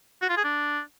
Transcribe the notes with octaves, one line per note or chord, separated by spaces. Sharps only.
F#4
F4
G#4
D4